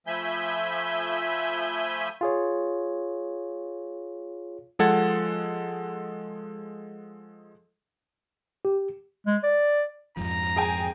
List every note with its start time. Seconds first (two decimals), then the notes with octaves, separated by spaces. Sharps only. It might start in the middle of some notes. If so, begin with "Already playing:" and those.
0.07 F3 A3 E5 G#5 B5 G6
2.21 F4 G#4 C#5
4.79 F3 G#3 A4 F#5 G#6 A6
8.65 G4
9.27 G#3
9.43 D5
10.17 F2 G#2 F3 A#5
10.56 G#4 G5 G#5